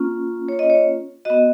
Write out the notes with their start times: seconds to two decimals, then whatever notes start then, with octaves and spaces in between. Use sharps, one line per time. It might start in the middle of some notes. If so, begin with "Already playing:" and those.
Already playing: A#3 C#4 F4
0.48 C#5
0.59 D#5
0.70 C#5
1.25 B3 F#4 D#5